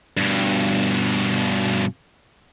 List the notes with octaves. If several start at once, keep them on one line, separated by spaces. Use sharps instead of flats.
G2 B2